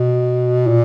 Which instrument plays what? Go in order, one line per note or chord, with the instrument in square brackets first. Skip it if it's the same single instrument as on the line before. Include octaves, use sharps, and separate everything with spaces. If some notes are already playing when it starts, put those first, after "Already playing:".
Already playing: [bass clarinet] B2
A#2